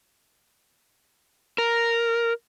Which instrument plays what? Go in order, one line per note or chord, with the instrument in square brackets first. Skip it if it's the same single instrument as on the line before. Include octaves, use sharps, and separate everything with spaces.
[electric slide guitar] A#4